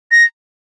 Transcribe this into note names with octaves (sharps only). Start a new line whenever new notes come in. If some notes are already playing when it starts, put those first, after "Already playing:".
A#6